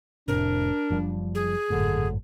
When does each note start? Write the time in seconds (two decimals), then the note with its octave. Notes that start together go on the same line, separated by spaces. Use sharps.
0.28 F1 A2 C3 D4 A#4
0.90 F#1 F3 G3
1.35 G#4
1.70 G#1 F#2 A2 D3